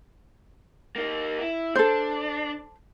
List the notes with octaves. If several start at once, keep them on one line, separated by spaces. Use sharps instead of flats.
A#3 D#4
E4
D4 A4 C5